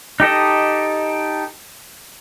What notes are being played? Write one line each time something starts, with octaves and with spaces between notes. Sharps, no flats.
D#4 G4 A4 D#5